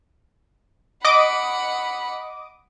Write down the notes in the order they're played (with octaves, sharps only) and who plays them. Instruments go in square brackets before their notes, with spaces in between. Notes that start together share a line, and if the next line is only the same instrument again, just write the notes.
[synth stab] D#5 D6 D#6 [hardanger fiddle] F#5 B5